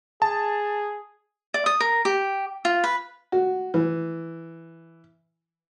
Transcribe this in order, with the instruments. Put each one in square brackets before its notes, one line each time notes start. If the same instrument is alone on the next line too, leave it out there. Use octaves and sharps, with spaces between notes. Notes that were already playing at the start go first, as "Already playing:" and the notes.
[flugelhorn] G#4 [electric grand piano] A5
[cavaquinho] D5
D#6
A#4
G4
F4
B4
[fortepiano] F#4
E3